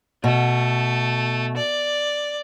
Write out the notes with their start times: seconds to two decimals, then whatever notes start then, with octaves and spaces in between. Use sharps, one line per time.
0.24 B2 A3
1.57 D5